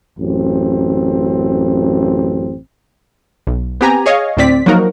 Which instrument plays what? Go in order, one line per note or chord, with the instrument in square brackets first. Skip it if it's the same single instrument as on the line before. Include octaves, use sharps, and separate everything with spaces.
[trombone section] A1 F#2 C4
[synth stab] B1
B3 C4 G4 G#5 A#5
G#4 C#5 D#5 F5
D2 A2 C4 D5 B6
F3 F#3 A#3 D#4 F#4 A#4